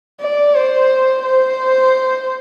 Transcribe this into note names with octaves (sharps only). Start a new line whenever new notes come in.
D5
C5
C5